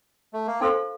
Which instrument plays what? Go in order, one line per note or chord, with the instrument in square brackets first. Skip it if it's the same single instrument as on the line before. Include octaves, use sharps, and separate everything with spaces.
[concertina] A3
A#3
[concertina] C4 [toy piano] D#4 A4 C5 F5 C6